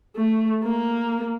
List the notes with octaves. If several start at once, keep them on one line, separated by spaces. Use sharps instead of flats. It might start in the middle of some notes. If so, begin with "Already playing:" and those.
A3
A#3